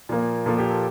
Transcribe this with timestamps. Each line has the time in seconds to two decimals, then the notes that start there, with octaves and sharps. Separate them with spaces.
0.09 A#2 F3 A#3
0.46 A#2 F3 A#3 A4
0.58 G4
0.70 A4